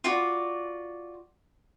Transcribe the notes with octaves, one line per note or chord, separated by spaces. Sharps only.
F4 F#4 D5